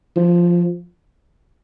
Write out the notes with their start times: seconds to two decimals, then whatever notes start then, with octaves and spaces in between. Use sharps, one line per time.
0.16 F3